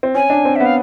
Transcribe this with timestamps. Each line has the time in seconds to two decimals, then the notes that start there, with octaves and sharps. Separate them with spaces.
0.03 C4
0.14 C#4 G#5
0.30 D4
0.45 C4
0.56 B3 E5
0.66 F5